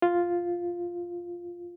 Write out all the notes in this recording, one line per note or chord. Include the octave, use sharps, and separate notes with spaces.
F4